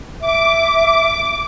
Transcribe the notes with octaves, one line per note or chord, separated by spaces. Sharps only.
E5 D6